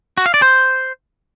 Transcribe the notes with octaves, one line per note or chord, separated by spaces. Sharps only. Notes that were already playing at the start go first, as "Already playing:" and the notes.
F#4
F5
D5
C5